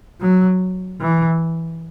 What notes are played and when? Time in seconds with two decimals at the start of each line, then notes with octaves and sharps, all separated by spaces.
0.21 F#3
1.01 E3